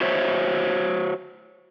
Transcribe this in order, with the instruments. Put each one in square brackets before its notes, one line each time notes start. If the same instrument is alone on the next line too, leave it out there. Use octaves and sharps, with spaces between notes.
[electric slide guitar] F#4 C5 C#5 E5